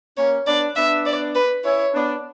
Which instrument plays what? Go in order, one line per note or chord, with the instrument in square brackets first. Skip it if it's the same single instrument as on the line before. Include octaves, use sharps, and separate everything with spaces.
[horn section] A#3 C#4 [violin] C#5
[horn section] B3 D4 [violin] D5
[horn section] B3 D4 [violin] E5
[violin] D5
B4
[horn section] C#4 E4 [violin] C#5
[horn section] B3 D4